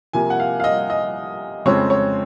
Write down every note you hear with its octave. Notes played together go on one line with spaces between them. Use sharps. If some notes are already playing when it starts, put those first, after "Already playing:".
C3 F3 A#3 G#5
F#5
F5
F5
D#5
D#5
F2 C#3 F3 G#3 C4 C#5
C#5